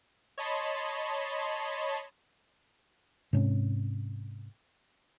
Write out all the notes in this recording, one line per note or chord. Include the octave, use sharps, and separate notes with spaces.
C#5 D#5 A5 B5 C6
G#2 C3 C#4